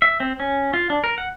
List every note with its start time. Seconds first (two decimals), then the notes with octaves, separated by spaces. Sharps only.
0.02 E5
0.20 C4
0.40 C#4
0.74 F4
0.90 D4
1.04 A#4
1.18 F#5